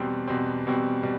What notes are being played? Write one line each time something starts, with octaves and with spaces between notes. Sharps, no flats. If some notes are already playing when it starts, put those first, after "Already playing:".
Already playing: E2 B2 G3 C4
E2 B2 G3 C4
E2 B2 G3 C4
B2 G3